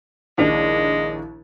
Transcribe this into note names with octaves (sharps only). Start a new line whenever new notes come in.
A#1 D#2 G#3 D4 E4